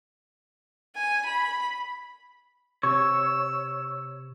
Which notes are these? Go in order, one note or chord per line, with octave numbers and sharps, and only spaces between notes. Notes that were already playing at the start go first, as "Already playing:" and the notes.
G#5
B5
C3 C#5 E6